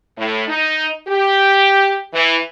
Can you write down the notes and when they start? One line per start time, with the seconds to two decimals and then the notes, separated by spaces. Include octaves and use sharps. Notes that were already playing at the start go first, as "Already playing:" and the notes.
0.18 A2
0.48 D#4
1.08 G4
2.13 E3